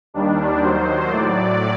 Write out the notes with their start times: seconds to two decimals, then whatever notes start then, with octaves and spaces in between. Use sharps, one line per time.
0.14 D#2 D#3 G3 D4
0.62 D#2 D#3 F#3 C5
1.11 A2 F#3 D5